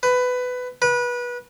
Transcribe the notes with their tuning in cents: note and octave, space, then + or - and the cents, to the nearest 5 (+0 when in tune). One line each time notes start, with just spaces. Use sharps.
B4 +15
B4 -25